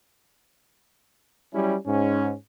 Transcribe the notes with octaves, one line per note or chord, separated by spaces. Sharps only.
F#3 G3 C#4 E4
G#2 C#4